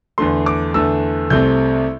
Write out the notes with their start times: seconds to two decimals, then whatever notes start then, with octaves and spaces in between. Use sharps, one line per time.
0.18 E2 D3 A3 C6
0.46 D6
0.74 E2 D3 A3 E6
1.30 C2 C3 A3 C4 G6